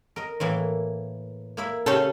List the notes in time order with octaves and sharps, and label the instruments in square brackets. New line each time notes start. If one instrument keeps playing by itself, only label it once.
[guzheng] A#4 D#5
A2 E3 A#3
A#3 E4 E5
[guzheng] C#3 C5 A5 [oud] C#4 G4 A4